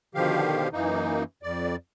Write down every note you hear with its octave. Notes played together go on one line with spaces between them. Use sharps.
B2 D3 D#3 F3 G4 F5
F#2 E3 A#3 D#4
F2 D5